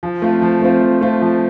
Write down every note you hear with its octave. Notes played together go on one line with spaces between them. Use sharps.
F3
A3 C4 F4
F3
A3 C4 F4
F3
A3 C4 F4
F3